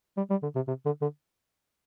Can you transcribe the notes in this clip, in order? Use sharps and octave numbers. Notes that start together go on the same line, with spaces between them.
G3
G3
D3
C3
C3
D3
D3